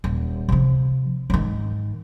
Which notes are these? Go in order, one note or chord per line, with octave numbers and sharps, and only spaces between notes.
D#1
C3 F3
G#2 D#3